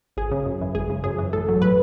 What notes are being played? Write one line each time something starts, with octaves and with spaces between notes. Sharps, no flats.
G#1 G#4
C#3
F#2
E3
G#1 G#4
C#3
F#2 G#4
E3
A1 A4
F#3
A2 B4